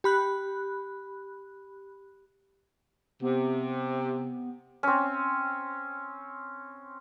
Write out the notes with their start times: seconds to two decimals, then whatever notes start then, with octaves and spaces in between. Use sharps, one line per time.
0.04 G4 B5 F#6
3.22 C3 B3
4.83 C4 C#4